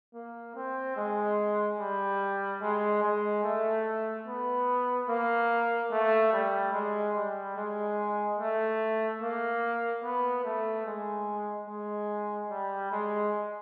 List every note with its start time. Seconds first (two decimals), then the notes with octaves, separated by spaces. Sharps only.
0.14 A#3
0.55 C4
0.97 G#3
1.79 G3
2.62 G#3
3.03 G#3
3.44 A3
4.26 B3
5.09 A#3
5.91 A3
6.32 G3
6.73 G#3
7.15 G3
7.56 G#3
8.39 A3
9.21 A#3
10.04 B3
10.45 A3
10.86 G#3
11.68 G#3
12.51 G3
12.92 G#3